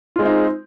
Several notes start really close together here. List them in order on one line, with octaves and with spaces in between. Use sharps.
F4 G#3 C4 D#4